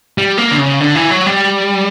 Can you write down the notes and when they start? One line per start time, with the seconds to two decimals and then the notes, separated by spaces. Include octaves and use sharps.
0.18 G3
0.38 A#3
0.51 D3
0.59 C#3
0.81 D3
0.95 E3
1.11 F#3
1.26 G3